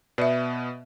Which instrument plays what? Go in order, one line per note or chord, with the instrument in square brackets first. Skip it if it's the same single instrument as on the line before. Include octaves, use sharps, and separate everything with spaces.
[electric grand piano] B2 B3 [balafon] D5 E5